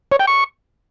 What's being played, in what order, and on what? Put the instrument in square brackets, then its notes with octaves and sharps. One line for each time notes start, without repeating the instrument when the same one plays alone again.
[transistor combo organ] C#5
G5
C#6